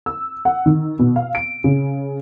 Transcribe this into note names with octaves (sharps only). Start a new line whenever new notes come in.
E6
F#5
D#3
B2
F5
D7
C#3